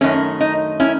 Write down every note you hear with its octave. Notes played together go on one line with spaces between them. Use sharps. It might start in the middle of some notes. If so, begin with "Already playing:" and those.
F#2 D#3 A3 C#4
D#4
C#4 E4